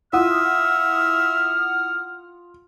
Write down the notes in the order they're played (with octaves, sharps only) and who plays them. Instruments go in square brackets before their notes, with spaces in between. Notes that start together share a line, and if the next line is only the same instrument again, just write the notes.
[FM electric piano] E4 F#5 D#6 [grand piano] F4 [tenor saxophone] E5 [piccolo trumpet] F6